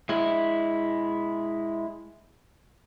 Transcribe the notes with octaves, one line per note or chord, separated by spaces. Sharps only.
G#3 E4